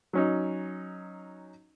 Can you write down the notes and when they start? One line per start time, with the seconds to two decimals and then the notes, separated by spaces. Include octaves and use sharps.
0.13 F#3 C#4 D#4